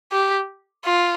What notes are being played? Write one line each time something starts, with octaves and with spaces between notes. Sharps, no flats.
G4
F4